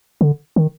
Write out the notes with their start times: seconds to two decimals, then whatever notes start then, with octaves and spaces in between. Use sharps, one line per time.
0.21 D3
0.56 D#3